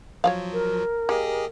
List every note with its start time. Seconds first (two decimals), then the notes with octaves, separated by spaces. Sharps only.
0.24 F3 F#3 C#5 D5 F5
0.53 A#4
1.09 A#3 G4 G#4 D#5